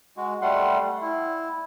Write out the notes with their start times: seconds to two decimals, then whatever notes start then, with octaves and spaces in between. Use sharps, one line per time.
0.17 G#3 F#4
0.42 G3 A3 F#5 C6
1.02 E4